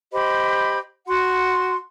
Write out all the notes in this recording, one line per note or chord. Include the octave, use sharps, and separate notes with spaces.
G4 C5 D#5 B5
F#4 F#5 C6